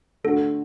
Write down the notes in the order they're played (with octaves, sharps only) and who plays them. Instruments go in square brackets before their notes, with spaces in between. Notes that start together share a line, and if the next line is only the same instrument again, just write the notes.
[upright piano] D3 A3 D4 F#4 [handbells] A4